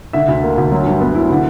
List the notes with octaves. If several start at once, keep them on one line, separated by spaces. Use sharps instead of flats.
D3 E5
D2
A#3
D2
F#3
G2
B3
E4
D3